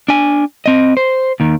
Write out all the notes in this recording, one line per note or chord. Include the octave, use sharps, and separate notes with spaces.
D4 G#5
C4 D#5
C5
D#2 D#3